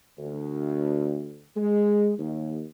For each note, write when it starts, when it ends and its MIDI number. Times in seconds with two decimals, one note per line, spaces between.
0.19 1.46 38
1.56 2.13 56
2.19 2.63 39